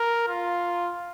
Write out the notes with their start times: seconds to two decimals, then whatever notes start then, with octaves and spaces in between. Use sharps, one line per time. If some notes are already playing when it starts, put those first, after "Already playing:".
Already playing: A#4
0.28 F4